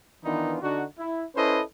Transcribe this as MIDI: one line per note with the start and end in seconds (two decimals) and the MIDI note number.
0.25 0.57 51
0.25 0.57 52
0.25 0.57 59
0.25 0.57 62
0.25 0.57 63
0.25 0.57 65
0.62 0.85 50
0.62 0.85 62
0.62 0.85 63
0.62 0.85 66
0.99 1.24 64
1.36 1.61 61
1.36 1.61 64
1.36 1.61 69
1.36 1.61 71
1.36 1.61 72
1.36 1.61 75